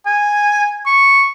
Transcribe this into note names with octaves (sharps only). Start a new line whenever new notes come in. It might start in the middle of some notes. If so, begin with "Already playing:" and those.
G#5
C#6